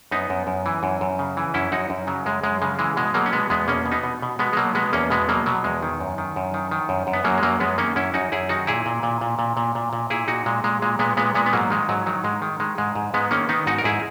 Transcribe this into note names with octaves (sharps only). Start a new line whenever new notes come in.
F#2 B3 D#4
F#2
F#2
E3
F#2
F#2
C#3
E3
F#2 C#4 E4
F#2 D#4 F#4
F#2
C#3 F#3
F#2 G#3
F#2 G#3
C#3 G#3
E3 G#3
B2 G#3
B2 F#3 A#3
C#4
B2 G#3 B3
E2 G#3 B3
B2 A#3 C#4
B2
B3 D#4
B2
B2
B2 G#3 B3
G#3
B2 F#3 A#3
B2 G#3 B3
E2 A#3 C#4
B2 G#3 B3
B2 F#3 A#3
B2 F#3
E2 G#3
D#3
F#2
D#3
F#2
D#3
D#3
F#2
F#2
B3
F#2 F#3 A#3
G#3
F#2 F#3 A#3
F#2 G#3 B3
D#3 A#3 C#4
F#2 C#4 E4
F#2 D#4 F#4
F#2 E4 G#4
D#3 D#4 F#4
A#2 E4 G#4
A#2
A#2
A#2
A#2
A#2
A#2
A#2
A#2 E4 G#4
A#2 D#4 F#4
A#2 G#3
A#2 G#3
A#2 G#3
A#2 G#3 B3
A#2 G#3 B3
A#2 G#3 B3
B3
G#2 F#3 A#3
D#3 G#3
G#2 F#3
D#3 F#3
G#2 G#3
D#3
D#3 G#3
G#2 G#3
G#2
G#2 G#3 B3
D#3 A#3 C#4
D#3 B3 D#4
G#2 D#4 F#4
A#4
G#2 E4 G#4